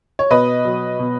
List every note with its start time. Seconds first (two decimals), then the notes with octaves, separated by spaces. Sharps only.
0.19 C#5
0.30 B2 B4 D#5
0.65 F#3
0.99 B2